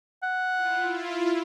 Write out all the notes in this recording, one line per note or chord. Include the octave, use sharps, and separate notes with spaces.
F#5
E4 F4